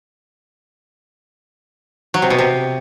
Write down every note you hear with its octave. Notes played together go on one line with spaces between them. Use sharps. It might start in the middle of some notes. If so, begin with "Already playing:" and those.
F#3
C3
B2
C3